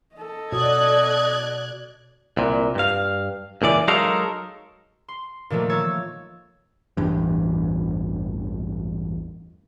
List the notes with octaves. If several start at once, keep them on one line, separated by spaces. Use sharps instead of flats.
A4 D#5
B2 F#4 C#5 D5 D#6 F#6 G#6
C2 A#2
G2 F5
C#2 A#2 E3 D5
F#3 G#3 D#4 A4 A#4 F5
C6
A#2 D#3 F3 A3 A#3
C#5 E6 A6
A1 E2 G2